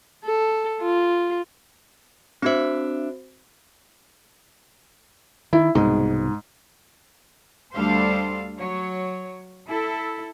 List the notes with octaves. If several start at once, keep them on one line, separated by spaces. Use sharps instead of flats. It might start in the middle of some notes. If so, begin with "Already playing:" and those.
A4
F4
C4 D4 F#4 C5 E5
D#3 E4
C2 G#2 B2 G#3
D2 G3 D4 A4 C5 F5
F#3 C#5
E4 A4